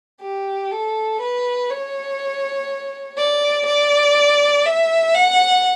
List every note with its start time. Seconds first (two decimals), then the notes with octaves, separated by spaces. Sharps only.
0.21 G4
0.71 A4
1.21 B4
1.69 C#5
3.17 D5
3.66 D5
4.65 E5
5.15 F#5